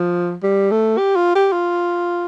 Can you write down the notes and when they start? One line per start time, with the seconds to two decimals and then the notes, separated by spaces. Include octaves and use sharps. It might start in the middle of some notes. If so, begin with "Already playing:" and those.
Already playing: F3
0.43 G3
0.71 A3
0.98 G4
1.16 F4
1.35 G4
1.52 F4